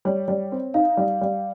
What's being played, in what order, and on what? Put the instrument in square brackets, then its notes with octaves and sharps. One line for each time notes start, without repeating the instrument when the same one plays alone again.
[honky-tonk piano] G3 [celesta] C#5
[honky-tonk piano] G3
C4
[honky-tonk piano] D#4 [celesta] F5
[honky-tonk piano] G3
G3